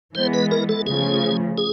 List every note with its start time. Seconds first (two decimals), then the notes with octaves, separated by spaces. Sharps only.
0.15 E3 G#3 B3 C5
0.34 B4
0.51 A#4
0.69 A4
0.87 C#3 F3 A3 G#4
1.58 G#4